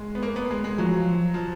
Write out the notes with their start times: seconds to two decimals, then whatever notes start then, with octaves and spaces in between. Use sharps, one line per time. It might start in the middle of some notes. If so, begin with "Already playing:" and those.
Already playing: G#3
0.15 B3
0.23 A#3
0.36 B3
0.51 G#3
0.64 G#3
0.78 F3 F#3
1.34 F3